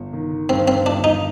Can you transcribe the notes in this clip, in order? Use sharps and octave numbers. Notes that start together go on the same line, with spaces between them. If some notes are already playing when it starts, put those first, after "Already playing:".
Already playing: G1
D#3
G2 C4
C4
G1 D4
D#4